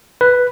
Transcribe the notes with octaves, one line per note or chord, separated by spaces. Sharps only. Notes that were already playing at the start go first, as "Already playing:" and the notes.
B4